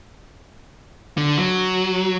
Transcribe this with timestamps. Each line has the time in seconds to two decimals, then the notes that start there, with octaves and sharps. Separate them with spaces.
1.18 D3
1.38 F#3